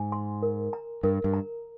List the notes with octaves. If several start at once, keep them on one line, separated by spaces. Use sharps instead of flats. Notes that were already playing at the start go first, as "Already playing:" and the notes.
Already playing: G#2 G#5
C6
A#4
A#5
G2 A#4
G2
A#5